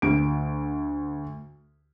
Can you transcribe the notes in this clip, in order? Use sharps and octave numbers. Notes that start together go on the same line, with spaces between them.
D2 D7